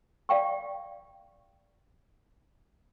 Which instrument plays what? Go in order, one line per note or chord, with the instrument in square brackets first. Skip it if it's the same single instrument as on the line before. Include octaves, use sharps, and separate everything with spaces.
[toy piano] D5 F5 G5 C#6